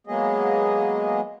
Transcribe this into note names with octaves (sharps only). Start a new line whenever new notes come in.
F#3 G#3 A#3 B3 G#4 D#5